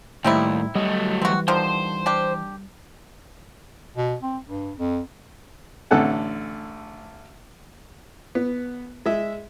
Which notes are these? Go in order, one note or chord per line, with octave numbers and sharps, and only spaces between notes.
D#2 A2 G3 A3 C4 D#4 E4
F#3 G3 A3 D#5
E3 C4 F#4
D3 D#3 F3 C5
D4 G4
B2
C4
G2
F2
A1 D3 A4 F#5 G#5
B3
G#3 E5